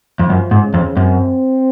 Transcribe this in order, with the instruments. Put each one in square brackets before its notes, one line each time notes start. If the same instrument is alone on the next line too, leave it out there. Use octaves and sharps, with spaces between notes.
[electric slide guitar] F2
[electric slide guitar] F#2 [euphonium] F3
[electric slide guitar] G#2
[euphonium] C#3
[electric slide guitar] F2
[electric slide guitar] F#2 [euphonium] C4